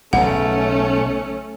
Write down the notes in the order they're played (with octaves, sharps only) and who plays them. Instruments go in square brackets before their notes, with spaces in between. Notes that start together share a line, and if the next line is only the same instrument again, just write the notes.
[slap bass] B1 C#3 [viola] A3 C#4 [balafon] F#5